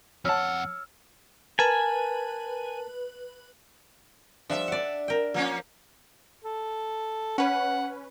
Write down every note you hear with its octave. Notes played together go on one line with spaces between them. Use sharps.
F2 C#5 F#5 A5 E6 F6
A#4 B4 G#5 A5
F3 G3 D4 E5
D5 F#5
A#4 G5
F3 A#3 C#4
A4
C#4 B4 F#5